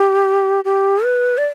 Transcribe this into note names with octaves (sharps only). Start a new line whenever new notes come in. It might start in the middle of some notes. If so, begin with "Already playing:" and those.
Already playing: G4
G4
B4
D5